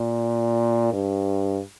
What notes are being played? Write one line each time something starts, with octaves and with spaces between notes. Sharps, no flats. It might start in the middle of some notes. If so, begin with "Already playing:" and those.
Already playing: A#2
G2